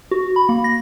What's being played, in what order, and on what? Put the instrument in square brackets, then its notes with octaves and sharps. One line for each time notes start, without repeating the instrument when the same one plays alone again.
[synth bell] F#4
B5
A#3
A#6